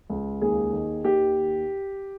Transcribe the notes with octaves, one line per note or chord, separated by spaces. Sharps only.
C#2
D#2 G#4
D#3
D#2 G4